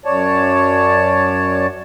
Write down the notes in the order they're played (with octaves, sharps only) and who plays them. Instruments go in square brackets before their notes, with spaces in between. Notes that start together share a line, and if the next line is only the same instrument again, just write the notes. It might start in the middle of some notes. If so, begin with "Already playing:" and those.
[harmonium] F#2 C#5 D5 A5